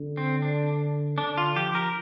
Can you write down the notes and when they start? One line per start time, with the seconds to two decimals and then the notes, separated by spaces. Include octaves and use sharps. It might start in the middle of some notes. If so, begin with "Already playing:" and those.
Already playing: D3
0.17 C4
0.42 D4
1.18 D3 D4
1.38 F4
1.56 F3 G4
1.75 A#4